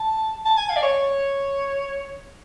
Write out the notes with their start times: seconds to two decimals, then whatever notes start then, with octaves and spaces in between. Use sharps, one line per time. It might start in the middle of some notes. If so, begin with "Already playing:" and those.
Already playing: A5
0.45 A5
0.57 G#5
0.70 F5
0.76 D5
0.83 C#5